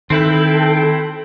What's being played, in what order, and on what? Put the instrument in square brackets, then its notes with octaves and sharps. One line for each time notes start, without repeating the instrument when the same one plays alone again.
[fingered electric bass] D#3 [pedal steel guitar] C4 E4 B4 [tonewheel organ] A4 G5